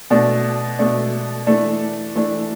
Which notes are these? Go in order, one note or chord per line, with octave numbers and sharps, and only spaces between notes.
B2 A3 D4
B2 A3 D4
E3 A3 D4
E3 A3 D4